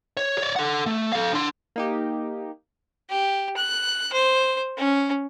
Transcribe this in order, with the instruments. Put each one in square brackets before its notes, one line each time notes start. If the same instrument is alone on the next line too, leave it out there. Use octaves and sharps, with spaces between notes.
[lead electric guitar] C#5
C#5 D5
A4 F#5
A3
A4 F5
D4 C6
[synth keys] A#3 D#4 G4
[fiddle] G4
F#6
C5
C#4